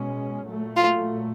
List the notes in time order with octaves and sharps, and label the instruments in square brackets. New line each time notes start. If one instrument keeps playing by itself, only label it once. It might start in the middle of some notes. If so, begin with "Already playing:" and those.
Already playing: [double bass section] B2 G#3 C#4
A#2 F#3 A3
[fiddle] F4